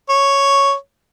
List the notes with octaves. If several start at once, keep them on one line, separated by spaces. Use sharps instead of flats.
C#5